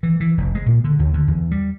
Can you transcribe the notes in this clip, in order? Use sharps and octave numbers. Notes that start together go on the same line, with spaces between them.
E3
E3
F1
G#3
A#2
D3
D#2
D3
E2
G3